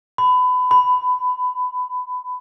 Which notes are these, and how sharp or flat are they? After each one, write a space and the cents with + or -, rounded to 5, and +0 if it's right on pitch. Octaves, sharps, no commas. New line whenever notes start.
B5 +25
B5 +15